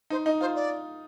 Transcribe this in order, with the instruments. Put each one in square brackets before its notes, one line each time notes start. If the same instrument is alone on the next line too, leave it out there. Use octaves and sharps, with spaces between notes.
[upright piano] D#4 [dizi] C5
[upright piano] D#4 [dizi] D#5
[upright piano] F4 [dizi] C5
[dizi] D5